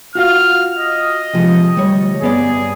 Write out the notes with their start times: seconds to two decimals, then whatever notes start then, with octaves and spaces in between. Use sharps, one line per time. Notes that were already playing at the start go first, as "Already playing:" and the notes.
0.15 F4 F#4 F5 F6
0.78 D#5
1.33 C3 F3 G#3
1.75 D2 G3 C#5
2.21 G2 B3 G#4 D5